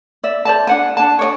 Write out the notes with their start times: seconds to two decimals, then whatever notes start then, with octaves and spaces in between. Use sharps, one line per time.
0.24 D5 E5
0.45 C5 D5 A5
0.67 D4 F#5 G#5
0.97 D4 G#5 A5
1.19 C#5 D5 G#5